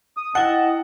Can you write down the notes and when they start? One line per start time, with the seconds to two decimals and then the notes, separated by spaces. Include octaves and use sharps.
0.17 D#6
0.35 E4 D#5 F#5 G5 A5